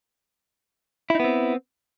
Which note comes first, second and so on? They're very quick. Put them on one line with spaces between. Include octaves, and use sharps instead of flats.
E4 D#4 B3 C4